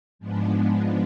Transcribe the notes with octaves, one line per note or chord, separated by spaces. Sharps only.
G#2 F3 G#3 B3 D4